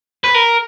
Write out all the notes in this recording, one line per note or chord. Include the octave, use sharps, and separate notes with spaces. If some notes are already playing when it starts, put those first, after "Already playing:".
B4
A#4